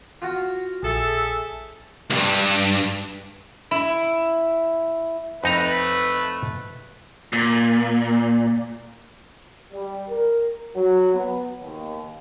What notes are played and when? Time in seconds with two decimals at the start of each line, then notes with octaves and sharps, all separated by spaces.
0.22 F4 F#4
0.83 A#1 G#4 A4 E5
2.10 C#2 G2
3.71 E4
5.44 F2 A3 D#4 B4 A#5
7.33 A#2
9.72 G3
10.09 A#4
10.75 F#3
11.13 B3
11.61 D#2